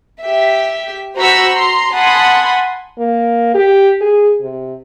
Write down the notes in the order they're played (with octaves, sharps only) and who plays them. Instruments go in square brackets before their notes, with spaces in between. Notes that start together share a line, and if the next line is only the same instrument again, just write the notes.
[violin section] G4 E5
F#4 C5 A#5 B5 C#6 E6
A#5 C6
F#5 G#5 A5 B5 C6 D#6
[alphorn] A#3
G4
G#4
C3